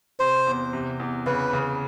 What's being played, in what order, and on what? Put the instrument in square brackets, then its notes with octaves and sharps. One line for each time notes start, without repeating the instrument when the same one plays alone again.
[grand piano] C3 [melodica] C5
[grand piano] E2
C3
E2
[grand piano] C#3 [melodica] B4
[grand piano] C#3